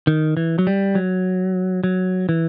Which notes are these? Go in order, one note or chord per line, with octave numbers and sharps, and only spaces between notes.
D#3
E3
F#3
G3
F#3
F#3
E3